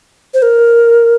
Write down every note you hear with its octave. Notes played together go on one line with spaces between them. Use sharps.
C5
A#4